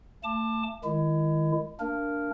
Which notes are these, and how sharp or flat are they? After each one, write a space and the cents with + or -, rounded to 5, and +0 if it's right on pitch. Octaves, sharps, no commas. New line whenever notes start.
A3 +30 A5 +0 D6 +25
D#3 +0 G#3 +0 E4 +30
A#3 -25 D4 +0 A#4 +0